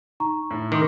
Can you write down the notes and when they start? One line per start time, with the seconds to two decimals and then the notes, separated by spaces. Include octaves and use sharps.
0.20 D#4 A#5 C#6
0.51 A2
0.72 D#3 C6 D6 D#6